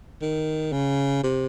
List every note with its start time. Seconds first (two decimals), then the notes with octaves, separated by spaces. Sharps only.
0.21 D#3
0.72 C#3
1.23 C3